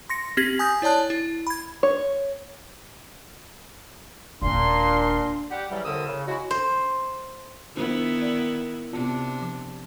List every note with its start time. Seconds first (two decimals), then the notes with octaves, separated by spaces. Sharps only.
0.10 C6 A#6 C#7
0.37 C4 G4 G#6 A#6 B6 F#7
0.59 G#5 D#6 G6
0.82 E4 C#5 D5 A5 F#6
1.10 E4
1.47 B5 G#6
1.83 C#5
4.42 D#1 A#2 D4 D#4 C6
5.50 G3 G4 F#5
5.70 C#3 E3 F#3 G3
5.85 C2 A2 D3 A#4 D#6 E6
6.07 C#3
6.27 F#3 G#3 E4 F#4
6.51 C5
7.76 D#3 B3 D4 E4 F4 C5
8.22 D5
8.92 C3 B3 D4 F4
9.41 F3